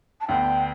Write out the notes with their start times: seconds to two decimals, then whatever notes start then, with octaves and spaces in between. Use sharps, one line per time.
0.21 A5
0.28 D2 D3 B3 G5